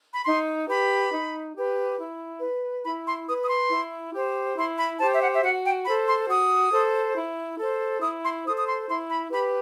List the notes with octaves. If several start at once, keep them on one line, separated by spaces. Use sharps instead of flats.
B5
D#4 C6
G4 B4 B5
D#4
G4 B4
E4
B4
E4 B5
C6
B4 D#6
D#6
C6
E4
G4 C5
E4 C6
B5
G4 C5 A5
E5
F#5
E5
F#4 F#5
G5
A4 C5 B5
C6
F#4 D#6
A4 C5
E4
A4 C5
E4 D#6
C6
A4 C5 D#6
D#6
C6
E4 C6
B5
G4 B4 B5